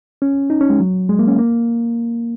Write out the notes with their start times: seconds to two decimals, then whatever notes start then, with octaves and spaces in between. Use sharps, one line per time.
0.22 C#4
0.50 D#4
0.61 C#4
0.70 G#3
0.80 F#3
1.09 G#3
1.19 A#3
1.28 C#4
1.38 A#3